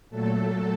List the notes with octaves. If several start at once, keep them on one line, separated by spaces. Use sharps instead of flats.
A#2 F#3 A3 A4